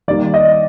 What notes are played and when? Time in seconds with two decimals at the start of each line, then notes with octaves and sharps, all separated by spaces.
0.08 D#3 G3 A#3 D5
0.34 D#5